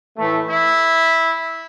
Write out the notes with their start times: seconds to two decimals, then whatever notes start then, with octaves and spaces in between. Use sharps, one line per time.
0.18 A2 E3 A3
0.49 E4